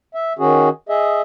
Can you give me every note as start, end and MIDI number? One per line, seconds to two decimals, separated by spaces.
0.14 0.33 76
0.39 0.69 51
0.39 0.69 61
0.39 0.69 66
0.39 0.69 68
0.89 1.22 68
0.89 1.22 75
0.89 1.22 76